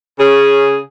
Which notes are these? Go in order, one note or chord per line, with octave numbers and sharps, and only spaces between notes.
C#3 C#4 G#4